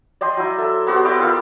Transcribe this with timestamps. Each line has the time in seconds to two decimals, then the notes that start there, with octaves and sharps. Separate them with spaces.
0.21 D5 D#5 G5 C6
0.37 F#3 E4
0.58 A4 E5
0.87 B3 F#4 G4 C5
1.05 B3 E4 D5 G5
1.19 E4 F4 A#4